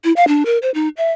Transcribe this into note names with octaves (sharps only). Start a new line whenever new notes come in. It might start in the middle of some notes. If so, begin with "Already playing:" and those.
E4
F5
D4
A#4
C5
D#4
E5